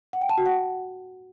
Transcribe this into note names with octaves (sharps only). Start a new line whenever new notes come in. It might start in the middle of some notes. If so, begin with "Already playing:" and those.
F#5
G5
A5
F#4
F#5